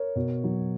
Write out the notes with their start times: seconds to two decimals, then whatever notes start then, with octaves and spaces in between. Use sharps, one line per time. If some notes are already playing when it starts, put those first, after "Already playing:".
Already playing: A#4 C#5
0.16 B2
0.44 F#3